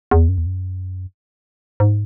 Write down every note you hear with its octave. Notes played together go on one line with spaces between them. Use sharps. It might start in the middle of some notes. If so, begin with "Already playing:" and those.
E2
F#2
E2
F#2
G#2